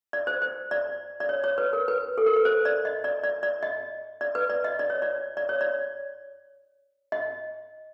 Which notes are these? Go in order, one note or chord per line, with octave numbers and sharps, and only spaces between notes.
D5
C5
C5
D5
D5
C#5
C#5
B4
A#4
B4
A4
A#4
B4
C5
D5
D#5
D5
D5
D5
D#5
D5
B4
D5
D#5
D5
C#5
D5
D5
C#5
D5
D#5